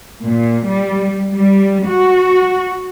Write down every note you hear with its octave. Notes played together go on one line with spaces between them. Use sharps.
A#2
G3
G3
F#4